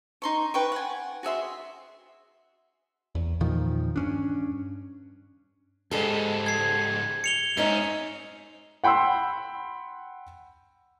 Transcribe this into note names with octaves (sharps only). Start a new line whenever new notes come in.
D#4 C6 C#6
B4 G5 C#6
F#5 G#5
F#4 G#4 E5 C6
E2
E2 A#2 D#3 F3
G2 C#4 D4
C#2 G#2 G3 G#4 A4
G#6 C7
C#7 F7 G7
G#2 C#4 D#4 E5
F#5 G5 B5 C6 E6